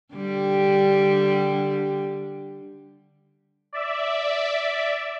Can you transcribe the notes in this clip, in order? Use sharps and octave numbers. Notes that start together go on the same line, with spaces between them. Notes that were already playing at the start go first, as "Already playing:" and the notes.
D3 G3 G4
D5 E5